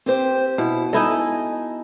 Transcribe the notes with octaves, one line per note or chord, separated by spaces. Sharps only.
C4 G4 C5
B2 E4
D#4 E4 A4 D#5 G#5